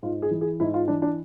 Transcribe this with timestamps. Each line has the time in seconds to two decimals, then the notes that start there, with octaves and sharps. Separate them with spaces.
0.02 G#2 F4
0.22 G#4
0.31 E3
0.41 G#4
0.60 G#2 E4
0.74 F4
0.88 E3 D4
1.02 D4